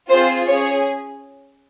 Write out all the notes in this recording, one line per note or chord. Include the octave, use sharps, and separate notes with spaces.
C4 F4 G#4 C5
C#4 G#4 C#5